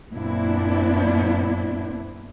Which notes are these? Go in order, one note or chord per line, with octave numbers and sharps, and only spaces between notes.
F#2 A#2 B3 C4 D4 E4